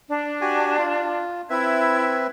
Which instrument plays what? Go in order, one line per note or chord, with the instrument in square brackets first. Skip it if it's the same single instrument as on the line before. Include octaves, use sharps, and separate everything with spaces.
[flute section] D4
[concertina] F#4 G4 G#5
F4
[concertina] C4 B4 E5 [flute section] E4 G#6